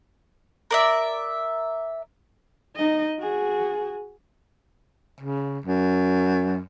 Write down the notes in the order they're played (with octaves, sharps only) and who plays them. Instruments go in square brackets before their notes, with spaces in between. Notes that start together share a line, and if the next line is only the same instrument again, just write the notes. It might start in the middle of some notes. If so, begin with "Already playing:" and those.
[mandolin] A#4 D5 E5
[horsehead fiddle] D#4 D#5
F#4 G#4
[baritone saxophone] C#3
F#2